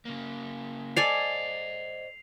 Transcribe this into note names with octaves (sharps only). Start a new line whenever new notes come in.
C#3 A#3
A4 C5 D5 D#5 G#5 C7 F7